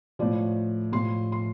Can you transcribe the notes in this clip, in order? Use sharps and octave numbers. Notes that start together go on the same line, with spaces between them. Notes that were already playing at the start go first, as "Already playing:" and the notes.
A2 F3 D5
A2 F3 C6
C6